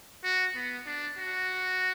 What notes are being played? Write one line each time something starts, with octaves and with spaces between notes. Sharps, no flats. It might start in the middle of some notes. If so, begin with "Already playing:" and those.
F#4
B3
D4
F#4